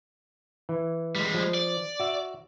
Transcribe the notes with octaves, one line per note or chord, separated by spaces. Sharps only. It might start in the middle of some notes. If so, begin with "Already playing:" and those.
E3
G3 G#3
F3
D5
F#4 E5